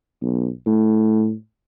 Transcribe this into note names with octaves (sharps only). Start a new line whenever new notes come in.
B1
A2